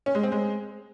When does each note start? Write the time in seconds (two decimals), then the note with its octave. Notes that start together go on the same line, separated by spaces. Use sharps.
0.06 C#4
0.15 G#3
0.23 C4
0.32 G#3